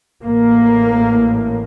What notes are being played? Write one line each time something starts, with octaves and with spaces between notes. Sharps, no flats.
A1 A2 A#3